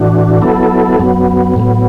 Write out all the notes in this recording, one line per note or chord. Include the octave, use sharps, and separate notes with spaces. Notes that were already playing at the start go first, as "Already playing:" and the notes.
Already playing: A2 E3 D4 F#4
F#3 B3 E4 A4
F#2 F#3 B3
A2 F#3 B3